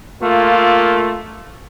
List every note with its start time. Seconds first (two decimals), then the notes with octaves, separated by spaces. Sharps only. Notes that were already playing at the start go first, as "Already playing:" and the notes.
0.21 A3 A#3 F4